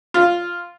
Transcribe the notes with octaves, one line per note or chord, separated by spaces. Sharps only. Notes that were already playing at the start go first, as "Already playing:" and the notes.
F4